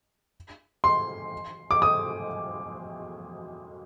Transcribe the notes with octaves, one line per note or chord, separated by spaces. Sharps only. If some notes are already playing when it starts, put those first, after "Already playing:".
C6
D6
D#6